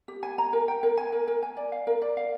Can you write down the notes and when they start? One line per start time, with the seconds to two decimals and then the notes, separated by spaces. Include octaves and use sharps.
0.08 G4
0.23 G#5
0.38 A#5
0.53 A#4
0.68 G5
0.83 A#4
0.97 G#5
1.12 A#4
1.28 A#4
1.43 G#5
1.57 D5
1.72 F5
1.87 A#4
2.02 D5
2.17 F5